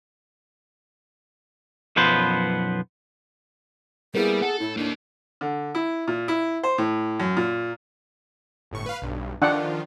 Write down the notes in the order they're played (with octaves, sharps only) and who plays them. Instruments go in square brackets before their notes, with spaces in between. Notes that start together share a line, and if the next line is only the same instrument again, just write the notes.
[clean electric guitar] B1 F#2 F3 B3 B4 C5
[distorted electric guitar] G3 [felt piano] A#3 B3 E4 [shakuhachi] G#4
[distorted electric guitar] A4 [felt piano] F#5
[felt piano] A2 [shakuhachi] E4
[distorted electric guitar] A#3 D#4 [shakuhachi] D4
[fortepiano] D3
E4
A#2
E4
C5
A2
F#2
A#2
[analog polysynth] G1 A2 C#6
B4 F5
B1 G2
[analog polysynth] D#3 F3 F4 [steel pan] D4 F#5 G5